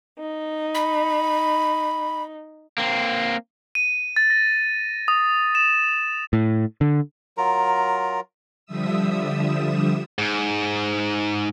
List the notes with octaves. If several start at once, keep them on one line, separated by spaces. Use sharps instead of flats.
D#4
B5
A#3 C4
D#7
A6
A#6
D#6
E7
A2
D3
F#3 F4 A#4 A#5
D3 F3 G3 E5 D#6 E6
G#2